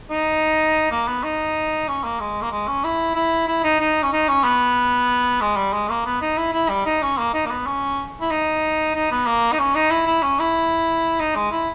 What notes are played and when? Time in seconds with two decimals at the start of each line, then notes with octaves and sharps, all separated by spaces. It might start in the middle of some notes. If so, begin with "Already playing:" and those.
0.10 D#4
0.91 A#3
1.07 B3
1.23 D#4
1.88 C#4
2.04 A#3
2.20 G#3
2.41 A#3
2.51 G#3
2.68 C#4
2.84 E4
3.15 E4
3.48 E4
3.64 D#4
3.80 D#4
4.03 C#4
4.13 D#4
4.28 C#4
4.44 B3
5.41 G#3
5.56 G3
5.73 G#3
5.89 A#3
6.05 B3
6.21 D#4
6.38 E4
6.53 E4
6.69 G3
6.85 D#4
7.02 C#4
7.18 A#3
7.33 D#4
7.46 A#3
7.50 B3
7.66 C#4
8.21 E4
8.31 D#4
8.95 D#4
9.11 B3
9.26 A#3
9.52 D#4
9.59 C#4
9.75 D#4
9.91 E4
10.06 E4
10.22 C#4
10.40 E4
11.20 D#4
11.35 G#3
11.52 E4